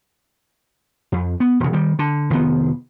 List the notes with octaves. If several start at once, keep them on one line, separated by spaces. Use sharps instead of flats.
F2
B3
E1 C#3
D#3 G3
D3
F1 D#3 F3 B3